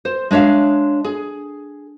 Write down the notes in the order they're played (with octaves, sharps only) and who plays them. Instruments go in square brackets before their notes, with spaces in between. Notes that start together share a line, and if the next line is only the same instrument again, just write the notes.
[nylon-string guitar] C5
G#3 D4 C#5 E5 F5
G#4